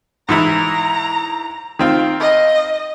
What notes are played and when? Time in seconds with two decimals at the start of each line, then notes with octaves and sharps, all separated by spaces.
0.29 G#2 E3 E4 A#5
1.79 D#3 C4 F4
2.20 D#5